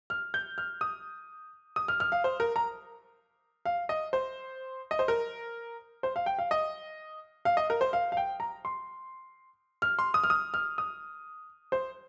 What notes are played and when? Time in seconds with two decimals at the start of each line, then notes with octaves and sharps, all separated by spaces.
0.10 F6
0.34 G6
0.58 F6
0.81 D#6
1.76 D#6
1.88 F6
2.00 F6
2.12 F5
2.24 C5
2.40 A#4
2.56 A#5
3.65 F5
3.89 D#5
4.13 C5
4.91 D#5
4.99 C5
5.08 A#4
6.03 C5
6.16 F5
6.26 G5
6.39 F5
6.51 D#5
7.45 F5
7.57 D#5
7.70 A#4
7.81 C5
7.93 F5
8.12 F5
8.17 G5
8.40 A#5
8.65 C6
9.82 F6
9.99 C6
10.14 D#6
10.23 F6
10.30 D#6
10.54 F6
10.78 D#6
11.72 C5